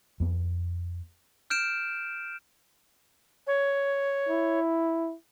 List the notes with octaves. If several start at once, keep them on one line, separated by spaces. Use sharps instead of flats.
F2 B3
F6 G6 D7 E7
C#5
E4